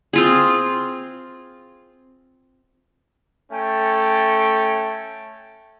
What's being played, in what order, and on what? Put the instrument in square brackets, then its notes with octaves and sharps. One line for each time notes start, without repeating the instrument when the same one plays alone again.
[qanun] C4 F4 G#4
[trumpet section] A3 C#4 G5 A5